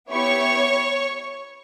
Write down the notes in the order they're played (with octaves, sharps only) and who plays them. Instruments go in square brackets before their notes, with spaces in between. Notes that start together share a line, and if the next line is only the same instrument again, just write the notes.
[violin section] B3 E4 G4 C#5 C#6